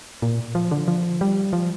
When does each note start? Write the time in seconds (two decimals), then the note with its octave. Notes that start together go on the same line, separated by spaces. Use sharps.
0.22 A#2
0.55 F3
0.71 D3
0.88 F3
1.21 G3
1.53 F3